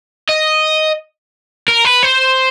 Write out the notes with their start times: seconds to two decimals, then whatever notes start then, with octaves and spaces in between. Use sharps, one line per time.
0.29 D#5
1.68 A#4
1.85 B4
2.03 C5